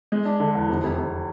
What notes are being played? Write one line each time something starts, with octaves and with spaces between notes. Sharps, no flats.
G#3
D4
D3
E2
F1
F1
F1